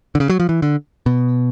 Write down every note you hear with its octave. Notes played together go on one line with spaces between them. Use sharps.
D3
C#3
F#3
F3
E3
D3
B2